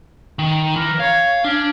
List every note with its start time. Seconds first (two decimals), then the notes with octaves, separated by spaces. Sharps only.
0.39 D#3
0.76 E3 A#4
1.00 C#5 F5
1.45 C#4 D4